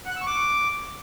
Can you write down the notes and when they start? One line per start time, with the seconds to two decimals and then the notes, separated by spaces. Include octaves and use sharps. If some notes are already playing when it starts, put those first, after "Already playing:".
0.05 F#5
0.11 F#6
0.16 E6
0.21 C#6
0.26 D6